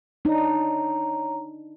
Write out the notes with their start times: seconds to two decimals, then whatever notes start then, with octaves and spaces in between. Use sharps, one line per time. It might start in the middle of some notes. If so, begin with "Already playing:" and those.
0.25 D4 D#4 C#5 A#5